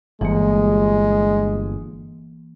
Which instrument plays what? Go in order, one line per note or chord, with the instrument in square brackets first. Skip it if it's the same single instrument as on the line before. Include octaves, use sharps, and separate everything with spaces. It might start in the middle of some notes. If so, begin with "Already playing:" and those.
[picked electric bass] G1 [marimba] E3 A#3 [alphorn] G#3